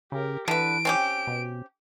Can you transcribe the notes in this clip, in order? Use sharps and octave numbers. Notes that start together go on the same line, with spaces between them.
C#3 G4 A#4
D3 E3 B4 D7
C4 C#4 G4
B2